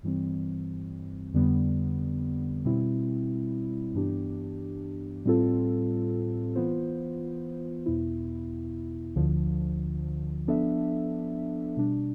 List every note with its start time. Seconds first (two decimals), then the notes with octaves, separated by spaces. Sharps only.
0.03 G2 E3 G3 C4
1.34 F2 D3 G3 B3
2.65 B2 G3 C4 E4
3.94 G2 E3 B3 D4 G4
5.25 A2 G3 C4 F4 A4
6.55 E3 B3 F4 C5
7.86 E2 B2 B3 E4
9.16 D2 D3 F3
10.47 F3 B3 D4 A4 E5
11.77 B2 G3 D4